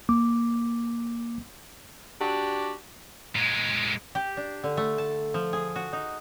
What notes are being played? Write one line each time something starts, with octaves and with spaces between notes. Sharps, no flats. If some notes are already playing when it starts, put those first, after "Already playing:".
A#3 D6
D4 F#4 G4
A#2 G#3
G4
D4
D3
A3
A5
F3
G#4
F#4
D#4